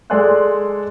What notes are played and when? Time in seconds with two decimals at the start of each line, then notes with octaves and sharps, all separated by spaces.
0.10 G#3 A4 D5 G#5 C6 F#6